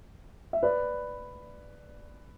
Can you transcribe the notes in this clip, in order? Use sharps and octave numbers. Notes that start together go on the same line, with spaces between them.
E5
B4 D5